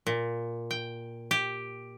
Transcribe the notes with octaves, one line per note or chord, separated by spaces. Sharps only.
A#2
G5
G4